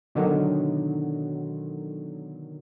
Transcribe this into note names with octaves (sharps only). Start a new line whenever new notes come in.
B2 D3 D#3 F#3